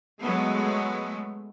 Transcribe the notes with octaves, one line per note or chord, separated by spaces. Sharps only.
F#3 G#3 A3 B3